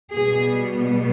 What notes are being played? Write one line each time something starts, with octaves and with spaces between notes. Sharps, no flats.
B2 G3 B3 G#4